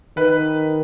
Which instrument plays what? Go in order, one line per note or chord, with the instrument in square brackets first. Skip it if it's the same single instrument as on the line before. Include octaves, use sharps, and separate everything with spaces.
[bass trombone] D#3 [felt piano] B4